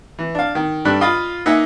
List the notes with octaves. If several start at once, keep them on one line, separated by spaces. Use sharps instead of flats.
E3
D4 F5
D#3
G2 D4 A4 F#6
F4 D#5 F5 B5 F6
A#3 D#4 E5 F#5 G#5